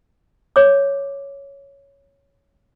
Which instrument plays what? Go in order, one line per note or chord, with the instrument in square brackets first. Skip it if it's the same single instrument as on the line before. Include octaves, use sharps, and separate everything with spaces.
[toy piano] C#5 D6